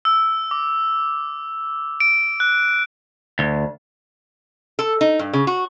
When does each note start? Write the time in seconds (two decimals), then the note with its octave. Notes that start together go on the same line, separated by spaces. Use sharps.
0.05 E6
0.51 D6
2.00 D7
2.40 F#6
3.39 D2
4.79 A4
5.01 D#4
5.19 G2
5.33 C#3
5.47 F#4